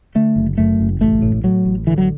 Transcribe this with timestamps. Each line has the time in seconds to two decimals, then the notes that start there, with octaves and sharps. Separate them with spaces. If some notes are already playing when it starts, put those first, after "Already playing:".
0.15 D3 A3
0.36 F#1
0.58 F#2 A3
0.80 F#1
1.01 A1 A3
1.22 A2
1.44 A2 F#3
1.65 A1
1.87 D3 E3
1.98 F#3